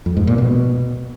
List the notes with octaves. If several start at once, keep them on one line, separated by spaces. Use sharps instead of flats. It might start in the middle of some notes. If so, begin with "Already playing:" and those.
F2
G#2
A#2
B2